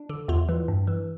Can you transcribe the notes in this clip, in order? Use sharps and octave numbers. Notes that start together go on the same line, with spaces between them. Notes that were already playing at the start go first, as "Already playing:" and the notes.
Already playing: D4
D3
E2 F4
E3
G2
E3